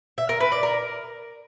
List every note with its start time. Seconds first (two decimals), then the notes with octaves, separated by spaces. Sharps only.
0.18 E5
0.29 A#4
0.40 B4
0.52 D5
0.63 A#4